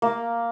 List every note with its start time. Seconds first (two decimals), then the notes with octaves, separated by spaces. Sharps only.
0.02 A#3